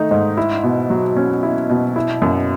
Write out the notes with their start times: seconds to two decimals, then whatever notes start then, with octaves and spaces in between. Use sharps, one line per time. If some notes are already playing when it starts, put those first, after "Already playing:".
Already playing: D#3 A3 D#4
0.11 G#2
0.37 E4
0.63 B2
0.90 F#3
1.17 C#4
1.43 E4
1.70 B2
1.96 E4
2.22 F#2